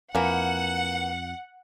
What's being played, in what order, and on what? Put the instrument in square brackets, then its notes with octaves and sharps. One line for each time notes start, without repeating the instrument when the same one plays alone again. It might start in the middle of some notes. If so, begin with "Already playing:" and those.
[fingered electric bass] F2 [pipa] E3 A#3 [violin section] F#5